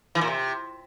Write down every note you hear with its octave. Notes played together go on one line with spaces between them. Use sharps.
E3
A#2
C3